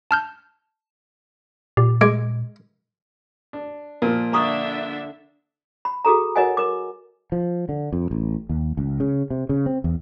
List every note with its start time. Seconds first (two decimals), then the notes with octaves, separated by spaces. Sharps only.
0.11 A5 F6 G6
1.77 A#2 G4
2.01 G#3 D6 G#6 D7
3.53 D4
4.02 A#2 F3 A#4
4.33 D3 D4 E5 A#5 C#6 D#6
5.85 B5
6.05 F#4 G#4 A4 A#5
6.36 F#4 A#4 C#5 D#5 F#5 G#5
6.57 A#4 D6
7.32 F3
7.69 D3
7.93 F2
8.11 A1
8.49 D#2
8.77 C#2
9.00 C#3
9.30 C3
9.49 C#3
9.66 C4
9.84 E2